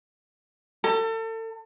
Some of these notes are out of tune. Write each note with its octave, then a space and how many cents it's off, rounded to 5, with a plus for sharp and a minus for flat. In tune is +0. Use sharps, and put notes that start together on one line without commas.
A4 +35